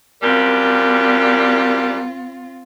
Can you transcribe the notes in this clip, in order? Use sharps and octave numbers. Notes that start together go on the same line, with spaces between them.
F#2 G3 C4 F4 A#4